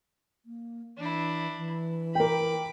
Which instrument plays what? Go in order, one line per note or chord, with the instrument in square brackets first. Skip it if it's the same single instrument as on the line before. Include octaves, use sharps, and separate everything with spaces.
[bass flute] A#3
[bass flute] E3 [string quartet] D4 E4
[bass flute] E3
[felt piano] A#4 G5 [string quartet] B5 D6